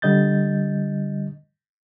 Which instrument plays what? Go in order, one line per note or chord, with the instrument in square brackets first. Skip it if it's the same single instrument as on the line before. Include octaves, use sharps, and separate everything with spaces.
[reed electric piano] D3 G3 D#5 G6 A6